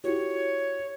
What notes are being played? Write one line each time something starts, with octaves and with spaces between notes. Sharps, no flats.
E4 F#4 G4 C#5